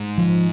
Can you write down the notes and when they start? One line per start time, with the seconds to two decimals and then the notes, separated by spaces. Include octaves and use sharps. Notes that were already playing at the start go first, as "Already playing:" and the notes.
Already playing: G#2
0.18 F3